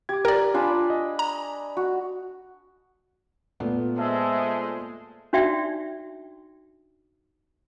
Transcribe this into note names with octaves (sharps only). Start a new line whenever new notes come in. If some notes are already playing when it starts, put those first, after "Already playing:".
G4 D6 G#6
G4 A#4 D5 A#5
D4 F4 G#5 B5
D#5
A#5
F#4
A#2 A3 B3
G#3 A4 C5 E5
D4 D#4 F#4 D5 E5 G5